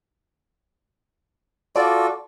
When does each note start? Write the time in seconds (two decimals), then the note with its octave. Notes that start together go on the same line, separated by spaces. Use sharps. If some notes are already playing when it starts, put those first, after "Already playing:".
1.76 F4 F#4 A4 D5